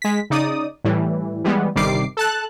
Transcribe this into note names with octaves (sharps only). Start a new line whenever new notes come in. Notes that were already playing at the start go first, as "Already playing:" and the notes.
G#3 B6
C#3 D#4 D5 D#6
A2 E3 G3
E3 G3 G#3 B3
G1 C3 D#3 G3 D6 C7
A4 A5 F#6